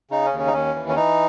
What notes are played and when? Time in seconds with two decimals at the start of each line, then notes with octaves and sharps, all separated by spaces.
0.11 C#3 D#4
0.26 C#4
0.32 D#2
0.39 C#4
0.47 D#4
0.53 D#2 C#4
0.75 E3
0.89 C#4
0.96 E3 D#4